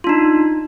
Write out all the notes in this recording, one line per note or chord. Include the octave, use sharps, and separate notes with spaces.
D4 D#4 F4